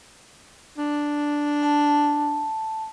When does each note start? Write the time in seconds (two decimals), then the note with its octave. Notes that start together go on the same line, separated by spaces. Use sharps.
0.78 D4
1.63 A5